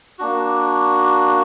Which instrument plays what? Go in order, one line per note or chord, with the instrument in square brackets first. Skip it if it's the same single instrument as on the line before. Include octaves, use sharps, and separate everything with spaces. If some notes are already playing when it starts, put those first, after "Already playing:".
[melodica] A#3 D4 F#4